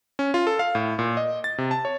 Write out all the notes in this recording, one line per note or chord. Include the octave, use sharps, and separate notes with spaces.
C#4
F4
A4
F5
A2
A#2
D#5
A6
C3
A5
C#5